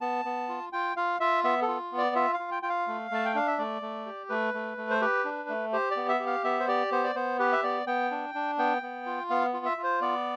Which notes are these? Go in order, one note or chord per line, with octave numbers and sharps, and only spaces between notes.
B3 A5
B3
F4
F4 G5
F4 F5
F4 E5
B3 E5
A4
F4
B3
D5
F4 E5
F5
F4
G5
F4 G5
F5
A3
A3 A5
G5
D4 F5
E5
A3 D5
A3
G4
A3 B4
A3
A3
C5
G4 B4
D4
A3
G4 C5
D5
B3
E5
G4
F5
B3 E5
C5
G4 D5
B3 C5
D5
B3 C5
G4 B4
E5
B3 D5
B3 G5
D4
D4
B3 G5
B3
F4
B3 F5
F4
E5
F4
C5
B3 D5